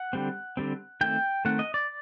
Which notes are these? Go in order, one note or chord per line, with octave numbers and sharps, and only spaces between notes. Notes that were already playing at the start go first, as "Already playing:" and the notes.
Already playing: F#5
D3 G3 C4
D3 G3 C4
D#3 A3 C4 G5
D#3 A3 C4 F#5
D#5
D5